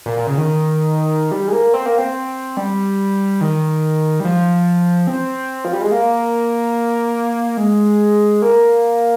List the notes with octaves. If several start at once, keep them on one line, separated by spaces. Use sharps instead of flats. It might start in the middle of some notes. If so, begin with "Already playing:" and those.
A#2
A#2
C#3
D#3
G3
G#3
A#3
C4
A#3
C4
G3
D#3
G3
F3
C4
F3
G3
G#3
A#3
G#3
A#3